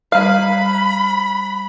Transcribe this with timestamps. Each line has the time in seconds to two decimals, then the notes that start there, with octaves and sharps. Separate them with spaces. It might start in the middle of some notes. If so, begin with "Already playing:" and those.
0.12 G3 F5 A#5 B5 F#6